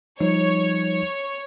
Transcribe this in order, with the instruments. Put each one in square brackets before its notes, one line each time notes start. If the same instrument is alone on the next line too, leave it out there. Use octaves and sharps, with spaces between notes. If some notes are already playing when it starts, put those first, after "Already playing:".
[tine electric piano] F3 G3 D#4 [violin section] C#5